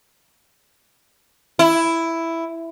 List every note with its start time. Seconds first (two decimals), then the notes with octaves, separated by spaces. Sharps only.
1.59 E4